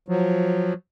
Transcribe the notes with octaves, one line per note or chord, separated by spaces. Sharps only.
F3 F#3